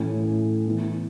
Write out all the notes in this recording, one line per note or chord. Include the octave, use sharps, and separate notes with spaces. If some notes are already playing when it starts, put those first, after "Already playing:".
Already playing: A2 E3 A3 C#4 E4
E3 B3 E4